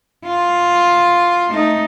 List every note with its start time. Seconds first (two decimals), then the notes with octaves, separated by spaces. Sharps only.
0.25 F4
1.50 A3 D#4